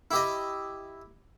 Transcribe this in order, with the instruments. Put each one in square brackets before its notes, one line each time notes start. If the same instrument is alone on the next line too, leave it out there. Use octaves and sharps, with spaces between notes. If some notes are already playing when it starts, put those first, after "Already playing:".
[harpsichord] E4 G4 D#5